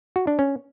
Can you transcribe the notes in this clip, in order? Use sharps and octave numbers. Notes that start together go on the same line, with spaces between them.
F#4
D4
C#4